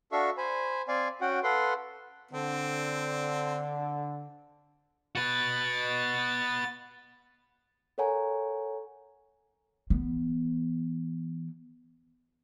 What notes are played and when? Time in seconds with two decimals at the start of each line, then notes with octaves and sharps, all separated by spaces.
0.12 D4 F#4 A4 E5 F5 C#6
0.37 C5 G#5 B5
0.88 C4 D5 F5 G#5
1.21 C#4 F#4 F#5 G5
1.43 A4 B4 F5 F#5 C6
2.31 D3 C4
5.15 F#4 B4 A6
7.98 A4 A#4 C#5 F#5 G#5 A#5
9.90 E3 B3